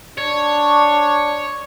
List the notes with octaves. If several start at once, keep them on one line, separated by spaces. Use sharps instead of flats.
D4 C#5